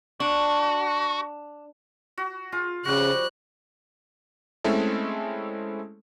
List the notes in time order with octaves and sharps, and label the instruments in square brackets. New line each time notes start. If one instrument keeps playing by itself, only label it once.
[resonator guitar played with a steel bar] D4 [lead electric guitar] F#4
[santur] F#4
[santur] F4 [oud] G#4
[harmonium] C#3 [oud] F3 C4 [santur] G3 F#4 [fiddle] F#6
[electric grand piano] G#3 A3 C4 C#4 E4 A4